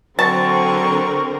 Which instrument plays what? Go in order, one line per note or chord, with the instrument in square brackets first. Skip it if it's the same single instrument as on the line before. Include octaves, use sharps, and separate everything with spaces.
[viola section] D3 C4 A#4 [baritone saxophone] F#3 [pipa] A5 [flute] C#6